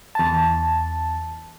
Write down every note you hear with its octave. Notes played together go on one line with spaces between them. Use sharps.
E2 A5